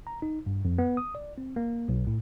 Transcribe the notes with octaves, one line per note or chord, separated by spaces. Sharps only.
A#5
D#4
G2
F2
B3
D#6
D5
C4
A#3
B1
A2